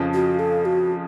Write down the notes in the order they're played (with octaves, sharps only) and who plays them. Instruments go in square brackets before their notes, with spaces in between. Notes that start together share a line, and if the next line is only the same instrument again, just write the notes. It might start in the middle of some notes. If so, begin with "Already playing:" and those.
Already playing: [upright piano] F2 C#3 F3
[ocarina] F#4
A4
F#4